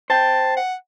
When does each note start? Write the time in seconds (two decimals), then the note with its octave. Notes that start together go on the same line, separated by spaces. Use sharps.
0.10 C5 G5 A5
0.57 F#5